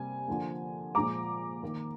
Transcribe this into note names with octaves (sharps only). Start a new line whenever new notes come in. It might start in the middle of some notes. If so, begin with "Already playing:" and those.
Already playing: C3 G3 A#3 G#5
D3 F3 A#3
A#2 F3 G#3 A#5 D6
D#3 A#3